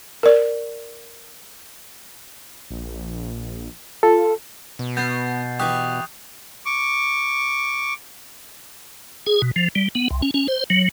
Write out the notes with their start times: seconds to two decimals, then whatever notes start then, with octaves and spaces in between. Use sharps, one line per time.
0.23 A#4 D5
2.70 A#1
4.03 F4 A4
4.79 B2
4.97 B3 G6 A6 C7
5.59 E3 G4 C#6 D#6 F#6
6.66 C#6 D6
9.27 G#4
9.42 B2
9.56 F3
9.75 G3
9.95 B3
10.10 C2
10.22 C#4
10.34 C#4
10.48 C5
10.70 F#3